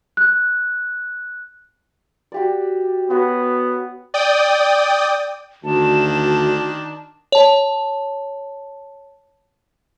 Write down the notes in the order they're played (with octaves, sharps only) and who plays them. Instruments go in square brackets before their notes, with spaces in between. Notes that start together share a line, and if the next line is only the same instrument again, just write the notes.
[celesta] F#6
[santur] F#4 G4 D5
[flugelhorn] B3 [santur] F#4 C#5
[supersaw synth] D5 G5 D#6
[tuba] D2 [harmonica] D#3 D4 [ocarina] F#4 [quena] A5
[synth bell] C#5 A5